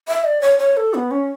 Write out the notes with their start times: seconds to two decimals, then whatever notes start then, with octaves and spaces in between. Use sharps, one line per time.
0.08 E5
0.25 D5
0.41 C#5
0.59 C#5
0.77 A4
0.94 B3
1.11 C#4